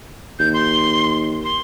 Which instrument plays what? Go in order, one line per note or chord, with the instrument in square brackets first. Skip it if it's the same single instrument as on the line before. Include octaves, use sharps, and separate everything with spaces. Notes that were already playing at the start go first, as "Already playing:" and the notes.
[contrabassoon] D#2 [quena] G6
[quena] C6
C6